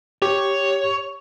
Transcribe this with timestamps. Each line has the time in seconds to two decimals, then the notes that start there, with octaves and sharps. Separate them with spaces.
0.22 G4 C#5